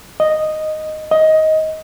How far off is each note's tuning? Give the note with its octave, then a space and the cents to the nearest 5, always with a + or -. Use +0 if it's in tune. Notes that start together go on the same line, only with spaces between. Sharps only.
D#5 -5
D#5 +15